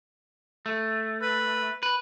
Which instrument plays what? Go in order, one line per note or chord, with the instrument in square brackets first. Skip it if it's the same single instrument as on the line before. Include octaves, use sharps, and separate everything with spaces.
[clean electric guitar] A3
[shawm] B4
[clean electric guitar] B4